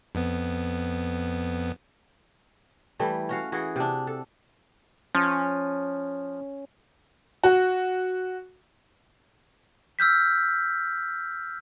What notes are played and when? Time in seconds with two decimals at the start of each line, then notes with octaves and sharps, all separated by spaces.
0.15 F2 B3
2.99 E3 G3 A3
3.29 C#4 F#4 F5
3.52 E3 F#4 G#4
3.76 C3 D4
4.07 A4
5.15 F3 C#4
7.44 F#4
9.99 E6 F6 G6 B6